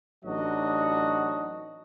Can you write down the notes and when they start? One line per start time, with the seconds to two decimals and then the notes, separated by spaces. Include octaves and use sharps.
0.25 A1 F#3 D4 D#4 F#4 D#5